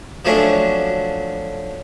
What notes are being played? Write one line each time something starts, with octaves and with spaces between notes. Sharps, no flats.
F3 F#3 A3 C#4 D4